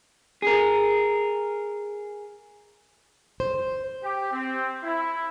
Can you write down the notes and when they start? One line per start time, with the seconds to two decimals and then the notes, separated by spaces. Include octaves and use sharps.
0.42 G#4 A#4
3.40 C5
4.02 G4
4.32 C4
4.83 E4